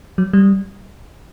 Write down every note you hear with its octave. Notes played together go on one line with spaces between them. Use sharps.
F#3
G3